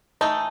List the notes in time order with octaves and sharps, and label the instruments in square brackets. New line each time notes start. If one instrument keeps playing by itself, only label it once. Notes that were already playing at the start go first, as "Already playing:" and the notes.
[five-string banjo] E3 A3 D#4 [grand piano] A5